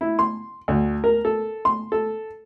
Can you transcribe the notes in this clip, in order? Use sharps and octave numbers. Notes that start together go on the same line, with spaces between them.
E4
C6
D2
A#4
A4
C6
A4